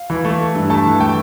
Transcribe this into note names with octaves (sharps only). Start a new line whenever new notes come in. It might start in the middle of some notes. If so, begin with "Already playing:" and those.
Already playing: F5
E3
A3
A3
G2
A3 A5
E3
A3 G5